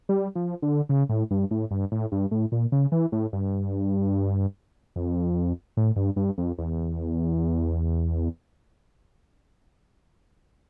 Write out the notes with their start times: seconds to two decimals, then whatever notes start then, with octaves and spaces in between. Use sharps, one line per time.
0.09 G3
0.35 F3
0.62 D3
0.89 C#3
1.09 A2
1.31 G2
1.51 A2
1.71 G2
1.92 A2
2.12 G2
2.31 A2
2.52 A#2
2.72 C#3
2.92 E3
3.12 A2
3.33 G2
4.96 F2
5.77 A2
5.96 G2
6.16 G2
6.38 F2
6.58 E2